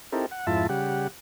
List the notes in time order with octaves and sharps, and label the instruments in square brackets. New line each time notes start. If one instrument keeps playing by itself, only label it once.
[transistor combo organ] C4 D#4 E4 G4 A4 A#4
F#5
F2 G#2 E4 F4 E5 A5
C#3 G3 G4 F#5